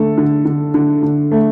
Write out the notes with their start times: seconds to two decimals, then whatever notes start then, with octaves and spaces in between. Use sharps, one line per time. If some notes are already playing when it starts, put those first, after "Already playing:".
Already playing: D3 A3 A4
0.18 D3
0.45 D3
0.74 D3
1.03 D3
1.32 A3